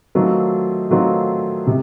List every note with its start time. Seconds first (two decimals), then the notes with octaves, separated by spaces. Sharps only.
0.15 D#3 F#3 A3 C4 F4
0.91 D#3 F#3 A3 C4 F4
1.67 C3